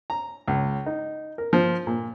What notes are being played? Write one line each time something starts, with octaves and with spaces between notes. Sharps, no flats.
A#5
C#2
D#4
A#4
F3
A#2